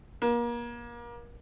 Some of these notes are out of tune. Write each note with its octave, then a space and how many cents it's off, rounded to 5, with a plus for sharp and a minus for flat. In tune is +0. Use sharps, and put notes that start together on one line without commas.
A#3 +30